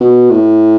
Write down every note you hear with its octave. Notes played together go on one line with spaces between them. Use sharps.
B2
A2